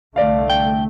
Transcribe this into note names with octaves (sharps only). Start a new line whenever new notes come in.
C2 D3 A3 D5 F5
G5